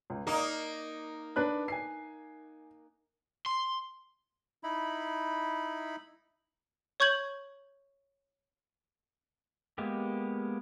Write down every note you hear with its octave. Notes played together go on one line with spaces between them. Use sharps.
C#2
A#3 D#4 A#5
D4 B4 F#6
G#5 C7
C6
D#4 E4 B5
C#5 C#6 G6 G#6 F#7
G#3 A#3 B3 G4